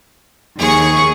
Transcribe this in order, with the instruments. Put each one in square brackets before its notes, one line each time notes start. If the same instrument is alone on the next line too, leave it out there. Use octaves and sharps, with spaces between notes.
[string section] D#2 C#6 [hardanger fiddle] G#4